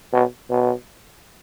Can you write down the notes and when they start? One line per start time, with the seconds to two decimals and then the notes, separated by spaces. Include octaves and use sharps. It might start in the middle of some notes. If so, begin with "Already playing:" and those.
0.13 B2
0.50 B2